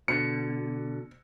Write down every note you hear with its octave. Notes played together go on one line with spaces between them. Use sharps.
B2 D3 C#7